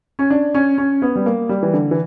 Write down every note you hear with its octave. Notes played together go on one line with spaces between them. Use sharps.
C#4
D4
C#4
C#4
B3
G3
A#3
G3
E3
D3
E3